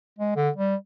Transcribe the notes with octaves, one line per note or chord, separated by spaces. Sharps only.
G#3
D3
G3